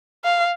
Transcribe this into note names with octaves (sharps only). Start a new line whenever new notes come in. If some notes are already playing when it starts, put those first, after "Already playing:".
F5